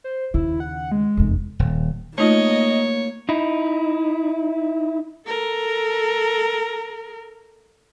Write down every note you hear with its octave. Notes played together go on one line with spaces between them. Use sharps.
C5
D#2 C#3 E4
F#5
G#3
F1 E2
D#1
A3 A#3 D#4 F4 C#5 D#5
D#4 E4
A4 A#4